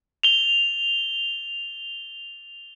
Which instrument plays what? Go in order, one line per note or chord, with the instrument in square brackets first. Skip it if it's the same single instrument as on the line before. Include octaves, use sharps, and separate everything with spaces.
[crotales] F7 G7